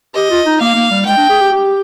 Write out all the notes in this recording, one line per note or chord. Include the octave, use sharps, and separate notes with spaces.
G4 D#5
F4
D#4
A#3 F5
A#3
G3
G#3 G5
D4
G#4
G4
G4